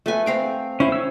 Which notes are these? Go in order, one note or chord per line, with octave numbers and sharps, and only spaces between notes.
A3 B4 G#5
C4 F5 G5
C#4 E4 C5
C#5 E6